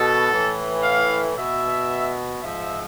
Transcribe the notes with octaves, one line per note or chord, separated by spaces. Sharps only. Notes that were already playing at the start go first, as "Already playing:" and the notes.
Already playing: B2 A4
A2 E3
F5
B2 E5
G#2 F3 E5